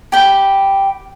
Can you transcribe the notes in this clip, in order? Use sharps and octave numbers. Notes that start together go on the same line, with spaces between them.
G4 G5 B5